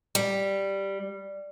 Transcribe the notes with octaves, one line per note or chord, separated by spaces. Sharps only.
G3